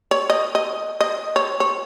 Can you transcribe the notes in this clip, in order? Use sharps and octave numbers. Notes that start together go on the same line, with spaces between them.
C#5
D#5
D#5
D#5
C#5
C#5